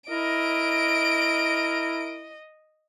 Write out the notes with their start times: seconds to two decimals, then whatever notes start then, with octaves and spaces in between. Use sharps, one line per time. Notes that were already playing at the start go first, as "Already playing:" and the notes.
0.10 E4 A#4 D#5 D7